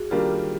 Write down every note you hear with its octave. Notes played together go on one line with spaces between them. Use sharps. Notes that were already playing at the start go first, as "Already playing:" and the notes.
Already playing: F#4 G#4
D#3 G3 A#3 D4 F4 G4